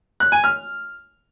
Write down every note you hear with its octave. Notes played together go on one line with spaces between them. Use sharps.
F#6
G#5
F6